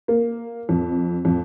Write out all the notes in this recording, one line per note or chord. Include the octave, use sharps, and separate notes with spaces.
A#3
F2
F2